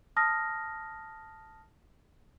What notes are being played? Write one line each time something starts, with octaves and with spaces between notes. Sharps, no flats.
A5 D#6 F6 A#6